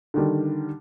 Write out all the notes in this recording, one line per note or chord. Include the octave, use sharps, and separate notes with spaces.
D3 D#3 G3